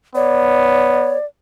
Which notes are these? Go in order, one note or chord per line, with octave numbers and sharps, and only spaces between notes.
B3 C#5 D5